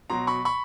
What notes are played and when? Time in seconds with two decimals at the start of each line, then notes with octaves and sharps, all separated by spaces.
0.10 B2 F#3 A#5 C6
0.27 B5 C#6
0.45 B5 C#6